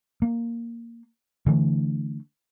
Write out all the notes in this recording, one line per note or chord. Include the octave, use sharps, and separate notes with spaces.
A#3
D3 E3 A3